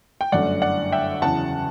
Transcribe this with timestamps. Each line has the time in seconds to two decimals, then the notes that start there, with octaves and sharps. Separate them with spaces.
0.21 G5
0.32 G1 F#2 D3 A3 D5 F#5
0.62 D5 F#5
0.92 E5 G5
1.22 E2 C#3 F#3 F#5 A5